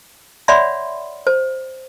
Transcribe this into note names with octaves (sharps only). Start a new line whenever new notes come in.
C#5 D5 E5 F#5 B5 C6
C5